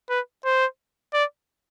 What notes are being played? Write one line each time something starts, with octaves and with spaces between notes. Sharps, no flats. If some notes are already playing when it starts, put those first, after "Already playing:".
B4
C5
D5